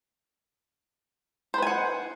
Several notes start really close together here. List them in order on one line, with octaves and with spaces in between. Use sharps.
C5 B4 G#5 F#5